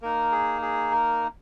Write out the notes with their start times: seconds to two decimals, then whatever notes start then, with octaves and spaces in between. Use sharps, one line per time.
0.02 A#3 D#4 A#4
0.32 G#4
0.62 G#4
0.91 A#4